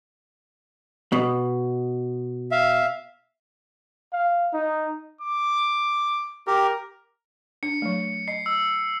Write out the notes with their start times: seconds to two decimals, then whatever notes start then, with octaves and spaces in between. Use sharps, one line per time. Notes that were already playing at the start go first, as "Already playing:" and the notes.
1.12 B2
2.52 E5 F5
4.13 F5
4.53 D#4
5.21 D6
6.47 G4 A#4
7.63 D4 C#7
7.82 F#3 A3
8.28 D#5 C7
8.46 E6